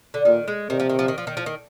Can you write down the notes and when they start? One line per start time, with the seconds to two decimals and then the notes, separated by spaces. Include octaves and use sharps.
0.14 D3
0.25 A#2 D#3
0.48 G#3
0.70 C3 D#3
0.80 F3
0.89 D#3
0.99 F3
1.08 D#3
1.18 F3
1.27 D#3
1.37 F3
1.46 D#3